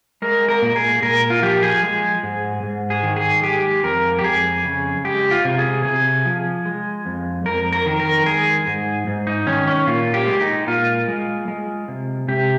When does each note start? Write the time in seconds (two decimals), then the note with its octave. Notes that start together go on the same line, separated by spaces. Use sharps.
0.22 G#3 A#4
0.49 A#4
0.62 A#2
0.76 G#4
1.02 A#2 A#4
1.30 F4
1.42 F3 G4
1.63 G#4
1.83 G#3
2.23 G#2
2.63 G#2
2.90 G#4
3.03 D#3
3.16 G#4
3.43 G#3 G4
3.84 F2 A#4
4.19 G4
4.24 F2 G#4
4.65 C#3
5.05 G#3 G4
5.31 F4
5.44 C3
5.58 G#4
5.85 C3 G#4
6.25 F3
6.66 G#3
7.06 F2
7.46 F2 A#4
7.72 A#4
7.86 D#3
8.00 A#4
8.26 G#3 G#4
8.66 G#2
9.07 G#2
9.27 D#4
9.47 D#3 C#4
9.67 C#4
9.87 A#2 F4
10.14 G4
10.27 G#3
10.41 D#4
10.67 A#2 F4
11.08 G#3
11.48 G#3
11.88 C3
12.28 C3 G4